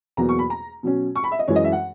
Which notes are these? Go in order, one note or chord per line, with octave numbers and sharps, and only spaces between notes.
E2 B2 F#3 A#3 A#5
C#6
B5
A#5
B2 F#3 C#4
C#6
B5
E5
D#5
F#2 E3 G#3 C#5
D#5
E5
F#5